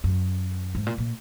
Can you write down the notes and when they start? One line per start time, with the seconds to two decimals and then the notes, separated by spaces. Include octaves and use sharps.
0.04 F#2
0.75 G#2
0.87 A#2
0.98 A#2